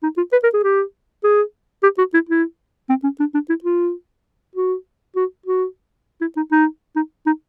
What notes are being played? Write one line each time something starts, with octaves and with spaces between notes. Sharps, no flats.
D#4
F4
B4
A#4
G#4
G4
G#4
G4
F#4
E4
E4
C4
C#4
D4
D4
E4
F4
F#4
F#4
F#4
E4
D#4
D#4
D#4
D#4